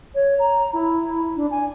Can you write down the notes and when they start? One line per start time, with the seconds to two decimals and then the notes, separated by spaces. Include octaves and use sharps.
0.15 C#5
0.39 A#5
0.73 E4
1.36 D4
1.51 G#5